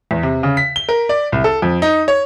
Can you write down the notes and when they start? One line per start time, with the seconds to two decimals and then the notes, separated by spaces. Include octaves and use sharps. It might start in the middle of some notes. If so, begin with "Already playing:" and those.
0.11 E2
0.23 C3
0.43 C#3
0.57 B6
0.76 G7
0.89 A#4
1.09 D5
1.32 C2
1.44 A4
1.62 F2
1.82 D#4
2.08 C#5